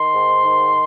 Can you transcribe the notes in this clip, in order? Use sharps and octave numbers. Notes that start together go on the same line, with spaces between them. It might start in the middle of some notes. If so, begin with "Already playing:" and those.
Already playing: D#3 C6
G#2
D#3